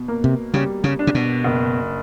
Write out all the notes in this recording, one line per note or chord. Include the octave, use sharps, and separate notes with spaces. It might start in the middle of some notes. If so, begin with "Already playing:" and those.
Already playing: B2
A#3
C3
C#3 G3
C#3
D4
C3
B2
F#1